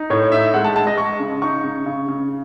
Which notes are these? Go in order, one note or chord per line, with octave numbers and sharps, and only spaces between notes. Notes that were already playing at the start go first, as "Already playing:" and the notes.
Already playing: D#4
A2 C#5
D#4 E5
G#3 F#5
A5
G#3 A5
D#5
G#3 C#6
C#3
D#4 C#6
C#3
C#3
C#3